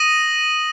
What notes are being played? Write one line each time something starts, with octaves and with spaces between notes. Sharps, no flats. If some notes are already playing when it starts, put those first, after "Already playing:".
Already playing: D#6 A#6 D#7 F#7